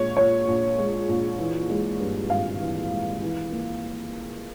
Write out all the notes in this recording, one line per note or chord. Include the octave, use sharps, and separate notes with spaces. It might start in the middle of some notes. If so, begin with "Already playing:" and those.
Already playing: A#1 G#3 C#5
A#2 C#5
A#1
G#3
A#1
E3
G#3
G2
G#1 F5
E3
G#3
E3
A#3